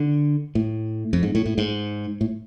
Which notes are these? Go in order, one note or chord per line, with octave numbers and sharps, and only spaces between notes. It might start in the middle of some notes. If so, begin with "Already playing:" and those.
Already playing: D3
A2
F2
G#2
A2
A2
G#2
A2